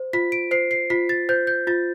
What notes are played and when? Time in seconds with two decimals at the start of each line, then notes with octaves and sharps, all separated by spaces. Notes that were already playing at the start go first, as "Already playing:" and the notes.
Already playing: C5
0.13 F4 B6
0.32 D7
0.51 C5 C7
0.71 C7
0.90 F4 B6
1.09 A6
1.29 C5 G6
1.47 G6
1.67 F4 A6